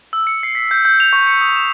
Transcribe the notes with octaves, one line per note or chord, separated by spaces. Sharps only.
E6
C#7
C7
B6
G6
G6
F7
C#6
C#7
D#6
E7